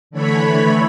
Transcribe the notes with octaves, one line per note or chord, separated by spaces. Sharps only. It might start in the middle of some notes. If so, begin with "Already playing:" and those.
D3 E3 A3 C#5 B5